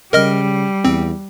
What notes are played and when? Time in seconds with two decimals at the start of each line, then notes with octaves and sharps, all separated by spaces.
0.13 C#3 G3 A#4 D#5 F6
0.85 E2 C4